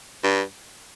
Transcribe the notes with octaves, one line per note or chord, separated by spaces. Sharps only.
G2